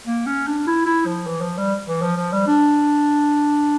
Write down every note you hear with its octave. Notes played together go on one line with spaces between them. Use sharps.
A#3
C#4
D4
E4
E4
F3
E3
F3
G3
E3
F3
F3
G3
D4